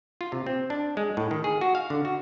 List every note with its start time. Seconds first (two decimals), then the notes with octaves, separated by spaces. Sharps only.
0.21 F4
0.32 C3
0.46 C4
0.70 D4
0.97 G#3
1.17 A2
1.31 D#3
1.44 G#4
1.61 F#4
1.75 F5
1.90 D3
2.05 F#4